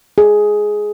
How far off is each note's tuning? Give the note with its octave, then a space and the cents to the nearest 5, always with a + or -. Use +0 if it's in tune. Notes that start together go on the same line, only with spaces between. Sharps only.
G#4 +10